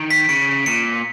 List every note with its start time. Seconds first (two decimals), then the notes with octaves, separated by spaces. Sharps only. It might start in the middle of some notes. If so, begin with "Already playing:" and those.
Already playing: D#3
0.11 B6
0.29 C#3 C#7
0.66 A#2 C#7